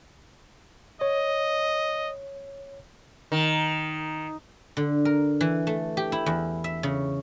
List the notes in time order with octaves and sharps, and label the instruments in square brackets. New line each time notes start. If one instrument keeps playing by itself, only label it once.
[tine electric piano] C#5 [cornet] D#5
[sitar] D#3
[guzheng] D3
A#4
E3
A3
G4
E4
E2
E5
C#3